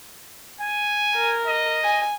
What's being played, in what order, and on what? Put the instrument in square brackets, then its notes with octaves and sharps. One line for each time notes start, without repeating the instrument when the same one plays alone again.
[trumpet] G#5
[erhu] A#4
[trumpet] D#5
[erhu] G#5